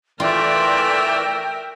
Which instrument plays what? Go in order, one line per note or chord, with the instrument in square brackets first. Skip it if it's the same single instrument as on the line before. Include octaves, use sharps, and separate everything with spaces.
[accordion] E3 A3 D5 [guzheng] F4 [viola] A#4 E5 [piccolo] G5